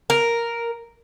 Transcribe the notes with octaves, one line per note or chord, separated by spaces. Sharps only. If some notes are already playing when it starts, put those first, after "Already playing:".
A#4